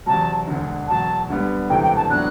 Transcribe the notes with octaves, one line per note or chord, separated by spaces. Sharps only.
E2 C3 F#3 A5
E1 D2 D3
E2 B2 F#3 A5
D2 D3 G3 B3
E1 D2 C3 E3 A3 G5
G5
A5
A2 F#3 B3 D4 F#6